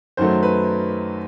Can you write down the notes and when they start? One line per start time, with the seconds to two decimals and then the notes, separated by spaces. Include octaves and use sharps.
0.17 F#2 D#3 F#3 A3 C5
0.43 B4